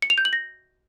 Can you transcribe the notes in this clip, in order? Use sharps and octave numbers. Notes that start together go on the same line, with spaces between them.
C#7
F7
G6
F#7
A#6